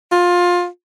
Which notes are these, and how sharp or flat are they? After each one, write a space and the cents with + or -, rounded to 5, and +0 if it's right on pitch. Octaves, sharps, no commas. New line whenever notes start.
F4 +20